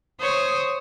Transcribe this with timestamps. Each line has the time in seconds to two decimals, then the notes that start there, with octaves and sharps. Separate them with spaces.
0.21 C5 C#5 D#6